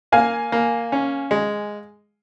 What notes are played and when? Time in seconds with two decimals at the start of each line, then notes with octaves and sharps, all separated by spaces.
0.12 A#3 F5 G#5
0.52 A#3
0.92 C#4
1.31 G#3